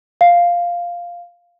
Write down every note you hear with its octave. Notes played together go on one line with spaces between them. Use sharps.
F5